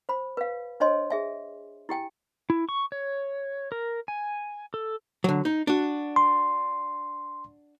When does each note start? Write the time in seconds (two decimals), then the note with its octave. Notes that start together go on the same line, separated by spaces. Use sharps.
0.09 C5 B5
0.37 B4 F5
0.80 D4 C5 C#5 D#5 G#5 C6
1.10 G#4 E5 G#5
1.89 E4 G4 G5 G#5
2.50 E4
2.69 C#6
2.92 C#5
3.72 A#4
4.08 G#5
4.74 A4
5.24 D3 F#3
5.45 D#4
5.67 D4 F#4
6.16 C6